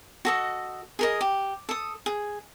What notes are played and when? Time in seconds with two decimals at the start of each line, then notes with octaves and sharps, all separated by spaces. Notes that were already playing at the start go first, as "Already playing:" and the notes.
0.25 F#4 A4 D#5
0.99 G#4 A#4 D#5
1.21 G4
1.69 A4 D#6
2.06 G#4